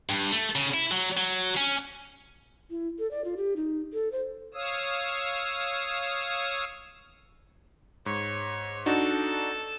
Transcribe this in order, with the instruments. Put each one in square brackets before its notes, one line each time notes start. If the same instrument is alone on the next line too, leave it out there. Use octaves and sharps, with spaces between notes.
[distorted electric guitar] G2
A3
C#3
E4
F#3
F#3
C#4
[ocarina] E4
A4
D5
F4
G4
D#4
A4
C5
[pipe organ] C#5 F5 D#6 E6
[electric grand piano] G#2 [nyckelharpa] C#5
[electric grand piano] D4 D#4 F#4 [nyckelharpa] A4 A5